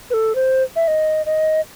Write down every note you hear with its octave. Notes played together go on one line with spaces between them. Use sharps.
B4
A4
C5
E5
D#5
D#5